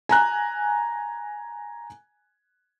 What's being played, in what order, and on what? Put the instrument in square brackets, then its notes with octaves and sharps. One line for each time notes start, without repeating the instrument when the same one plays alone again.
[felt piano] G#5 A#5 F#6